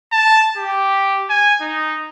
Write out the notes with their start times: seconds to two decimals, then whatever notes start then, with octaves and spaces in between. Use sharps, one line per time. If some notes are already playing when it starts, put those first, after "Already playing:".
0.12 A5
0.57 G4
1.30 G#5
1.61 D#4